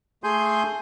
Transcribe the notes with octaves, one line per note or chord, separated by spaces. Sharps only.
A3 G#4 G#5 C6 G6